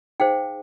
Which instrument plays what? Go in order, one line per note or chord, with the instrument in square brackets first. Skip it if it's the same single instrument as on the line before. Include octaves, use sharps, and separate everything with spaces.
[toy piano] D#4 G#4 C5 F5 G5